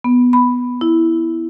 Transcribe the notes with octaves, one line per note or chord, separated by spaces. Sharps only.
B3
B5
E4